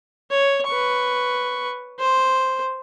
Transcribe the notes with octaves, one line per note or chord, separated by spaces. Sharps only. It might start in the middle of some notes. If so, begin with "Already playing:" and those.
C#5
B4 C#6
C5